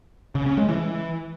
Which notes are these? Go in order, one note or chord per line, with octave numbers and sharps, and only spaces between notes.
C#3
C#4
G#3
E3